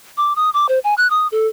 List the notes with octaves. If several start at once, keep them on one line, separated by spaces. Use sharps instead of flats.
D6
D#6
D6
C5
G#5
F#6
D#6
A4